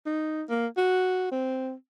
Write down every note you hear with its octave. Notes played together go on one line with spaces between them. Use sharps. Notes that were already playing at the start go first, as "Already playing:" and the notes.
D#4
A#3
F#4
C4